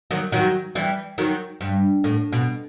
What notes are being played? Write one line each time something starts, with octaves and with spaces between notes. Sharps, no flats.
D#3 F#3
D#3 F#3
E3 G3
D#3 F#3
G2
A2
B2